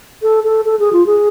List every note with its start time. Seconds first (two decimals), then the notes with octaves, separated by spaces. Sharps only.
0.23 A4
0.44 A4
0.65 A4
0.79 G#4
0.93 F4
1.06 G#4